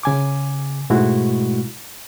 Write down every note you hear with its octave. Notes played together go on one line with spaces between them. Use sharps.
C#3 G#5 D6
G#2 B2 G#3 A3 E4 F#4